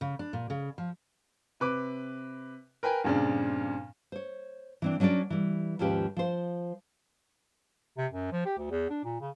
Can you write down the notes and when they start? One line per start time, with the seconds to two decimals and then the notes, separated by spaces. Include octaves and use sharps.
0.01 C#3
0.19 D4
0.33 A#2
0.50 C#3
0.78 F3
1.60 C3 B4 D6
2.83 A#4 B4 G5 G#5
3.04 G2 A#2 C#3 C4 D4
4.12 C5 C#5
4.82 E3 C4 D4
5.00 F#3 C#4 D4 A#4 D5
5.30 E3 G3
5.79 D#2 G#2 F3 C#4 G4 B4
6.17 F3 C5
7.97 C3
8.12 F#2
8.32 F3
8.45 G4
8.58 D2
8.70 E2
8.90 D4
9.04 A#2
9.21 C#3